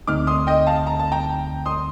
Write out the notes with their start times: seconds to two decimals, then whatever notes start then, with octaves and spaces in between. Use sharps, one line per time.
0.07 D2 D3 A3 C4 D#4 D6 F6
0.27 C6 D#6
0.47 D#5 G5
0.67 F5 A5
0.87 A#5
0.99 A5
1.12 G5 A#5
1.66 C6 D#6